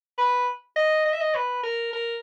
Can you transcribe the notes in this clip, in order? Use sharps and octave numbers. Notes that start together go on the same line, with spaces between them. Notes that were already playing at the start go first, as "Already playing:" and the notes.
B4
D#5
D#5
E5
D#5
B4
A#4
A#4